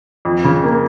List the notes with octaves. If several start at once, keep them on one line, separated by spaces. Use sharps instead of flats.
F2
C#3
A#3